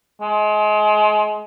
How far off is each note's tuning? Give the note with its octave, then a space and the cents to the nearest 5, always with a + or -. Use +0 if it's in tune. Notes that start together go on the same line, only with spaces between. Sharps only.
G#3 +30